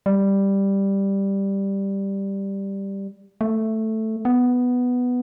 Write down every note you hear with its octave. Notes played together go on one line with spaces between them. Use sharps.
G3
A3
B3